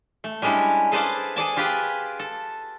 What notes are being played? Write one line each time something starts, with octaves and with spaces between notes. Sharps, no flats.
A3
G3 G#3 C#4 D4 E4
G#4 A4 B4 C5 D5 F5
G#4 A4 D5 A5
F4 G4 G#4 B4 G5
A4